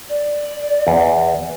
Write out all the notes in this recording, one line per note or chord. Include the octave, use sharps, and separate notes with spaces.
D5
E2